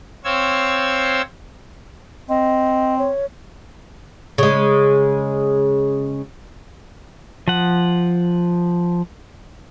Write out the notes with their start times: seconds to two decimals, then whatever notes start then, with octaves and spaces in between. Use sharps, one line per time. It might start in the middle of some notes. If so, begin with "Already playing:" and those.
0.24 C4 C5 C#5 F5 E6 G#6
2.29 C4 D#5
2.99 C#5
4.38 C#3 G#3
7.48 F3 F#5